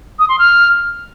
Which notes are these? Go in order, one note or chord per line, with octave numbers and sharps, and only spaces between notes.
D#6
C6
F6